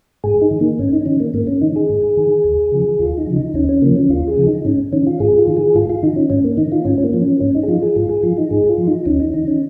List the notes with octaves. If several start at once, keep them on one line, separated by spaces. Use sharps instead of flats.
G#2 G#4
D#4
D#3
A#3
G#2 C#4
D#4
D#3 C#4
A#3
G#2 A#3
C#4
D#3 D#4
G#4
G#2
D#3
D#2
C#3 F3
D#2 F4
D#4
C#3 F3
D#4
D#2 C#4
C#4
C#3 F3 A#3
C#4
D#2 F4
G#4
C#3 F3
D#4
G#2 C#4
D#3 C#4
F4
G#2 G#4
F4
D#3
G#4
G#2 F4
F4
D#3 D#4
C#4
G#2 C#4
A#3
D#3 D#4
F4
G#2 C#4
C#4
A#3
F3
C#4
G#2 C#4
D#4
G#4
F3 F4
G#4
G#2 F4
G#4
F3 F4
D#4
G#2 G#4
F4
F3
D#4
D#2 C#4
D#4
D#3 D#4
C#4